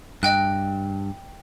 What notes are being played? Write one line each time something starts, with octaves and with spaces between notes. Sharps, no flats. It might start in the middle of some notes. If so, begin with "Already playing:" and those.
G2 D#5 G5 F#6